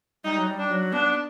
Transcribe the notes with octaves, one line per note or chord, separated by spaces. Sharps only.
G3 D#4
F#3
G3
D4
F#3
B3 D4